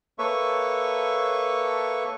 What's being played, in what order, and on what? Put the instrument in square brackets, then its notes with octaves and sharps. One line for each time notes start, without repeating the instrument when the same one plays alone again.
[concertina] A#3 A4 B4 C#5 E5 C#6